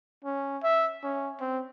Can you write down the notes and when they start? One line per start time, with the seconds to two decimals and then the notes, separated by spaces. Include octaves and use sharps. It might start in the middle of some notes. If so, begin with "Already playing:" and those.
0.24 C#4
0.63 E5
1.03 C#4
1.40 C4